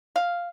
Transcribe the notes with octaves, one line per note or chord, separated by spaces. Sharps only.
F5